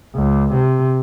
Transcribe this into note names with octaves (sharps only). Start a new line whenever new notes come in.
C#2
C3